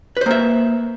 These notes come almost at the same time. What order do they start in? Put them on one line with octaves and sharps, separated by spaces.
B4 C5 A#3 E5